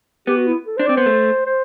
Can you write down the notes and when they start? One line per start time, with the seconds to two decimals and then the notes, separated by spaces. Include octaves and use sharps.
0.27 B3 G4
0.37 F#4
0.47 E4
0.67 A4
0.77 D4 C5
0.86 C4 D5
0.97 B3 C5
1.06 A3
1.46 C5